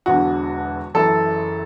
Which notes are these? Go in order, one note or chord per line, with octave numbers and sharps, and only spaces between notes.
E1 E2 D3 F#4
F#1 F#2 E3 A4